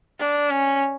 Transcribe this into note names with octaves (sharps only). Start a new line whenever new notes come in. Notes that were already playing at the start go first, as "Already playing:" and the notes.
D4
C#4